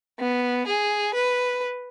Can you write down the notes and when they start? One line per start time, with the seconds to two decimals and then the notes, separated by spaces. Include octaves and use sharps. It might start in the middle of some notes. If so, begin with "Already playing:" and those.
0.19 B3
0.67 G#4
1.14 B4